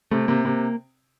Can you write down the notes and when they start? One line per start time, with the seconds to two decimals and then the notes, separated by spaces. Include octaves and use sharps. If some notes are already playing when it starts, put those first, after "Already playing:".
0.11 C3 A3
0.28 C3 A#3
0.45 C3 A#3